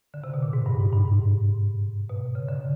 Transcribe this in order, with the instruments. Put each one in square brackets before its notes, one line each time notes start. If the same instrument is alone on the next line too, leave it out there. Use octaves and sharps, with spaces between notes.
[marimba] D3
C3
B2
A#2
G#2
G2
G#2
G2
G#2
B2
C#3
D3